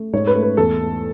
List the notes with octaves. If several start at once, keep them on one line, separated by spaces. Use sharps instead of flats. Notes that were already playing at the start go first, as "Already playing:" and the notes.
Already playing: A3
G#2 C#5
B4
A3
B4
E2 A4
A3